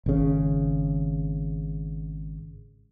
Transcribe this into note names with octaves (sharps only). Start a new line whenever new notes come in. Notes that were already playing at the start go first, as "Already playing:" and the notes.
G#1 C#3